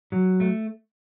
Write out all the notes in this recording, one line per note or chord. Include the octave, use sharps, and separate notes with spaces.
F#3
A3